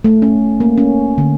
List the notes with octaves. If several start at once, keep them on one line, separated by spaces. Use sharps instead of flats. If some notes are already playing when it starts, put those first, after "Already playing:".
A3
C#4
A#3
C#4
D3